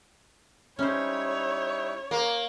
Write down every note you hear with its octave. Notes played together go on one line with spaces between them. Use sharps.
G3 C#4 D#4 E4 C5 C#5
A#3